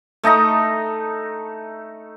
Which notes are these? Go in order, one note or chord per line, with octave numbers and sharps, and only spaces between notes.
A3 D#4 D#5 A#5